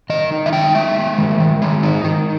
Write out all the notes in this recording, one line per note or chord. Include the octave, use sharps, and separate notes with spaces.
D#3 D#5
D#4
E5
G#3 G5
G#3 E5
G#3
D#3
D#3
G#3
D#4
D#3